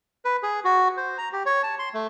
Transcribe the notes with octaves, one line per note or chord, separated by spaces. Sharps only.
B4
G#4
F#4
C5
A#5
G4
C#5
A5
C6
A3